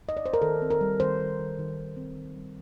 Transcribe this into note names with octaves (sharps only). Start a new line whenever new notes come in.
D#5
D5
C5
A#4
D#3 A4
C4
A#4
G3
D#3 C5
D#3
D#3
D#3
D#3
C4
D#3
G3